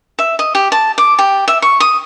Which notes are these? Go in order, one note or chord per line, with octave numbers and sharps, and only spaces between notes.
E5
D#5
G4
A5
D6
G4
E5
C#6
D#6